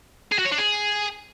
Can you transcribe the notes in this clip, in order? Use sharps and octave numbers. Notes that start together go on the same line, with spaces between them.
G#4
F#4
C#5
D4
G#4